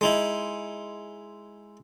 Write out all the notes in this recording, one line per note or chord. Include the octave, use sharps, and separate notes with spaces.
G#3 D#4 E4